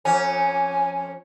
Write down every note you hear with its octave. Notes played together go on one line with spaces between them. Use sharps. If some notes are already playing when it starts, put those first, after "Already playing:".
F2 C#4 G#5